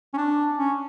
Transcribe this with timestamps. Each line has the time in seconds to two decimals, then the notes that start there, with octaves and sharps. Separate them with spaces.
0.14 C#4
0.17 D4
0.58 C#4